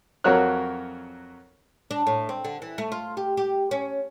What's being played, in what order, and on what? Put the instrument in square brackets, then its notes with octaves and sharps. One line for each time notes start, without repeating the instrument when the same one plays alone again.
[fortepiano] F2 F#3 F#4 A#4 C#5 F#6
[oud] D4
A2
C4
D3
E3
A3
F4
G4
G4
C#4